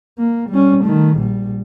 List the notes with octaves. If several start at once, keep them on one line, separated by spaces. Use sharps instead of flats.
A#3
G3 C#4
D#3 A3
A#1 G3